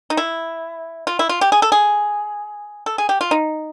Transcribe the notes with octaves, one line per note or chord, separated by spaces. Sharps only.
D#4
E4
F4
E4
F4
G4
G#4
A4
G#4
A4
G#4
G4
F4
D#4